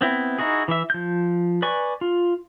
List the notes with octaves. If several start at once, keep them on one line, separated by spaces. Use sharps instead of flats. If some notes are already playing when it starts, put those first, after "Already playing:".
B3 C4 E4
D#4 E4 F#4 G#4
E3 E5
F3 G6
B4 D5 G#5 C#6
F4